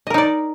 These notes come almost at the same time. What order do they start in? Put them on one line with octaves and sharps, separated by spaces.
D#5 A#4 D#4 D5